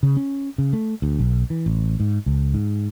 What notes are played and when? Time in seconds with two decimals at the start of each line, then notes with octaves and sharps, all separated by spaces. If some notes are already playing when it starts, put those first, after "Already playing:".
0.03 C#3
0.17 C#4
0.58 C#3
0.73 A3
1.02 D2
1.19 B1
1.50 E3
1.66 A1
2.00 G#2
2.26 C#2
2.54 G#2